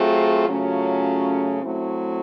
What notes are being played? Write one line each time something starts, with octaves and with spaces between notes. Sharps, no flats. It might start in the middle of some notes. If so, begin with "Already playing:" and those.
Already playing: F#3 A3 C4 F4 G#4
C#3 F#3 A3 C#4 F4
F#3 A3 C4 E4